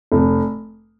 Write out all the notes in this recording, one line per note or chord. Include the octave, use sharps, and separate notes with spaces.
F1